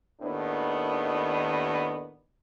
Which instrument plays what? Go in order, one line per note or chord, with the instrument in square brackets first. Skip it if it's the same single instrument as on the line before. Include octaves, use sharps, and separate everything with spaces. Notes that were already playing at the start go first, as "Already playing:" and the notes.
[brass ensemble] D#2 A2 D#3 B3 D4 D#4